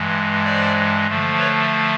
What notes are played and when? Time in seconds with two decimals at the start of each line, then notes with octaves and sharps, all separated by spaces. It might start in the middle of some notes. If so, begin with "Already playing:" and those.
Already playing: G2 E3 G#3
0.44 C5 D5
1.07 D3 F3 A3
1.38 B4 C#5